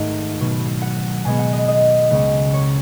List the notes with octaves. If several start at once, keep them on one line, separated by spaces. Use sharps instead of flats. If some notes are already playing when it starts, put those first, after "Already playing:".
Already playing: G#2 D#3 A3 F#5
B2 F#3 B3
F#5
B2 G#3 B3 G#5
F#5
D#5
D#5
C#2 C#3 G#3 B3
C#5